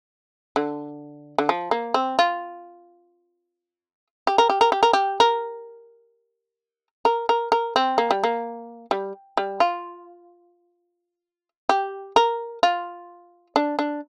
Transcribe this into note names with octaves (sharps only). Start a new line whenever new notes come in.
D3
D3
F3
A#3
C4
F4
G4
A#4
G4
A#4
G4
A#4
G4
A#4
A#4
A#4
A#4
C4
A#3
G3
A#3
G3
G3
F4
G4
A#4
F4
D4
D4